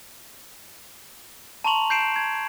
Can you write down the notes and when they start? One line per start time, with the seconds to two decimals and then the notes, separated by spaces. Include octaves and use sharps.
1.64 A5 A#5 C6 C#6 F7 F#7
1.90 A5 G6 C7 D7 E7
2.16 G#6